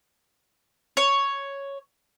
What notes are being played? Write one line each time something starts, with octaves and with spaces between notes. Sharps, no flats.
C#5